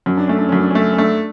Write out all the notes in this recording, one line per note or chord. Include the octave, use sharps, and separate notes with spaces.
F#2 C#4
D4
A3 C#4
D4
F#2 C#4
D4
A3 C#4
C#4
A3 D4